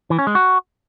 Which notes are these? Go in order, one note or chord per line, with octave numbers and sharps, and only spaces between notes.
E3
C#4
G#3
F#4